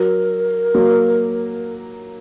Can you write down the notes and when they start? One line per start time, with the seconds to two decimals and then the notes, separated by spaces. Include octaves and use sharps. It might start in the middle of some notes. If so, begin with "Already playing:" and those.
Already playing: F#3 A#4
0.74 F#3 A#3